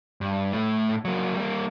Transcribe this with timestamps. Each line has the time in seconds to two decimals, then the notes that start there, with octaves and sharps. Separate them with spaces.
0.21 G2
0.53 A2 A3
1.05 F#3 A#3
1.35 G3 A#3